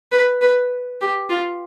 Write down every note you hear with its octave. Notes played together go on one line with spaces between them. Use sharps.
B4
B4
G4
F4